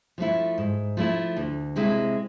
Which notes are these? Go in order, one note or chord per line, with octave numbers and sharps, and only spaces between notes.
F3 A3 E4
G#2
F3 A3 E4
D2
C3 G#3 C4 E4